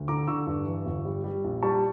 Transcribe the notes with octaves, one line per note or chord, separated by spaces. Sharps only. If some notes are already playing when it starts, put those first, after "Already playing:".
Already playing: D2
D3 A#5 D6
D3 C#6 E6
G2
E3
G1
G3
G3
A#1
G3 A5 C#6